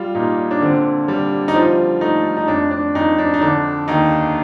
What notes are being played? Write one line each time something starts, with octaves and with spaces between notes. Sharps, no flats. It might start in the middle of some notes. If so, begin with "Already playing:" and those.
Already playing: G3 F4
A#2 D#4
D4
D3 C4
G3
D#4
F3 F4
A3 D#4
D#4
F2 D4
D4
F2 D#4
D4
D#4
D3 D4
D#2 D#4